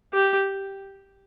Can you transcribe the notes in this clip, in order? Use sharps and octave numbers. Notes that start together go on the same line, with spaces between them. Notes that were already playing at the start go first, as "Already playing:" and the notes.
G4